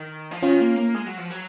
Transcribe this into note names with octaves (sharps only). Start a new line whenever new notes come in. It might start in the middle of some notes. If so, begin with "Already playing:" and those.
Already playing: D#3
F3
D#3 C#4 F4
A#3
A#3
G#3
F#3
F3
F#3